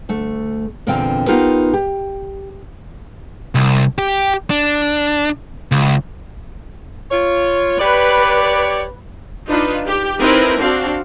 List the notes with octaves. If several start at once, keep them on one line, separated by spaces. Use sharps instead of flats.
D2 A3
E2 A#2 D3 C4 F5 G5
B3 D#4 F4 G4 A#4 B4
G4
C2
G4
D4
C#2
F4 C#5
G4 B4 C#5 D5
D4 D#4 F4 B4
G4
C4 D#4 E4 A#4 B4
C4 D4 F#4 F5